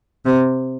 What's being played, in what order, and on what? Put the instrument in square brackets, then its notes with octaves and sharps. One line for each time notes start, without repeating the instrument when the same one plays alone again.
[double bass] C3